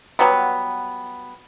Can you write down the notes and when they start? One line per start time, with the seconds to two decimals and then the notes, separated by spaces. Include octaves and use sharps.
0.19 F#3 G3 B3